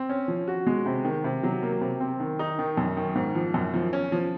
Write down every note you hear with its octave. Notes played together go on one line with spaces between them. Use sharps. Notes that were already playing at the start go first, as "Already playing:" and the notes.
Already playing: C4
C#4
F3
F#4
G#3
C3
D#3
C3
F#3
A#3
C3
C4
D#3
D#4
D#3
F#2
D#3
G#2
F3
F#2
F3
C#4
F3